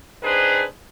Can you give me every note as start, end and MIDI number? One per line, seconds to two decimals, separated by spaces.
0.23 0.63 60
0.23 0.63 62
0.23 0.63 63
0.23 0.63 68
0.23 0.63 71
0.23 0.63 72